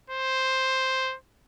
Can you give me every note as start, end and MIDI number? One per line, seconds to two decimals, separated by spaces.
0.10 1.16 72